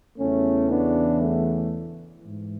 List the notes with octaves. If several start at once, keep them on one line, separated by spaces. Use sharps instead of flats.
E2 C#3 E3 A3 C#4
B3 D4
A3
G#2 E3